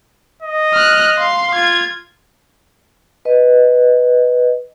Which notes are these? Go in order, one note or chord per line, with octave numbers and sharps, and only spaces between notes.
D#5
F6 F#6
F5 C6
F4 G#6
B4 D#5